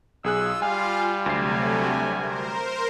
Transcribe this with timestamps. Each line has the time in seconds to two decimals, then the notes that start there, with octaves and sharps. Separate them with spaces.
0.24 B1 F4 G#4 E6 F#6
0.62 G3 F5 G#5
1.26 D2 C3 F#3 A3 G#5 C7
2.18 A#4 C5